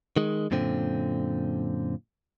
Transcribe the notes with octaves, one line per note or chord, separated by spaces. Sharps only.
D#3 G#3
F#2 A#2 D3 C4